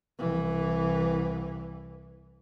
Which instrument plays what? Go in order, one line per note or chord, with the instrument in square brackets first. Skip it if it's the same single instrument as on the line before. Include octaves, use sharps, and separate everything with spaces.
[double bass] C2 E3